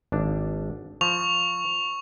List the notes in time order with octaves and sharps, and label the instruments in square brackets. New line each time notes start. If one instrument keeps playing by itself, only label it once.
[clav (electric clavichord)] G#1 D4
[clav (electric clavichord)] F3 [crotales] C#6 F7